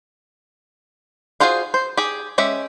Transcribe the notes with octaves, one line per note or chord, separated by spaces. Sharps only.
F4 F#4 G#4 C5 F5
C5
G4 G#4
G#3 C#4 G4 E5